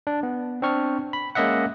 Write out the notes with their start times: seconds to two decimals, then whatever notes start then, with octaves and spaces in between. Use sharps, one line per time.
0.07 D4
0.23 B3
0.62 C4 D4 C#6 F6
1.13 B5
1.35 G#3 A#3 C#4 D#5 E5 F#5